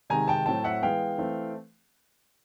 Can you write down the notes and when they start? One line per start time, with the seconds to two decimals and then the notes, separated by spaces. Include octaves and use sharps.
0.10 C3 D#3 G#3 G#5 A#5
0.28 G5 A5
0.46 A2 F#3 A3 C4 G5 A5
0.64 E5 F#5
0.82 E3 G#3 B3 F5 G5
1.18 E3 A3 C4